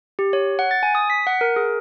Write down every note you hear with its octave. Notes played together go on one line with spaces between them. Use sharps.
G4
C#5
F#5
A6
G#5
D#6
B6
F#5
A#4
G#4